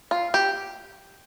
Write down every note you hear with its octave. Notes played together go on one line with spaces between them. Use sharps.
F4
G4